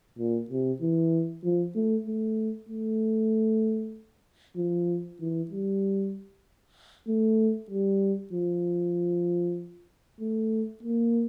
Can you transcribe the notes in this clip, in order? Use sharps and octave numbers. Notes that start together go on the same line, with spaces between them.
A#2
C3
E3
F3
A3
A3
A3
F3
E3
G3
A3
G3
F3
A3
A#3